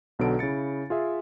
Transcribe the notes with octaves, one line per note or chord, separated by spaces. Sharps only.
B1 B2 D3 F#3 A4 D7
C#3 E4 A6 C#7
F4 G#4 E5